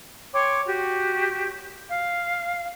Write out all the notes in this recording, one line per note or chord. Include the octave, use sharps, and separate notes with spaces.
C#5 G5 C6 D6
F#4 G4
F5